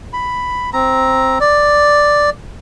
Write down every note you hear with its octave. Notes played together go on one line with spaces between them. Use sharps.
B5
C4 A#5
D5